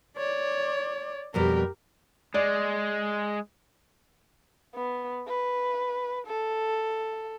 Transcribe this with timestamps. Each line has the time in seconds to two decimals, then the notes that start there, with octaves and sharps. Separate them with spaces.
0.17 C#5 D5
1.34 F2 B2 G3 G4 A#4
2.34 G#3 D5
4.75 B3
5.27 B4
6.27 A4